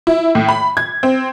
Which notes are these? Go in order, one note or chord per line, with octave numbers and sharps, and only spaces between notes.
E4
A2
B5
G#6
C4